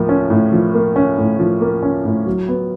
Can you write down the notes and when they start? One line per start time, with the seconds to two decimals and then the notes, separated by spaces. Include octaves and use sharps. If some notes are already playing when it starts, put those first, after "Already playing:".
Already playing: A2 F3 A#3
0.09 C#4
0.30 A2
0.52 F3
0.74 A#3
0.96 C#4
1.18 A2
1.39 F3
1.61 A#3
1.83 C#4
2.05 A2
2.26 F#3
2.48 B3